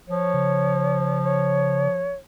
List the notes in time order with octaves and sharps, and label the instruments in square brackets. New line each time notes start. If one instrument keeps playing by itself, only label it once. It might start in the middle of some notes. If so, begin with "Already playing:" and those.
[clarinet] F3 [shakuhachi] C#5
[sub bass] C#3
[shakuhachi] C#5